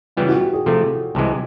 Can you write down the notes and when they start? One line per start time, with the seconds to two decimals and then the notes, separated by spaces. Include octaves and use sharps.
0.17 C#3 E3 G3 B3 F4
0.29 F#4
0.41 G4
0.53 G#4
0.66 C3 F3 A3 A4
1.15 C2 C3 E3 G#3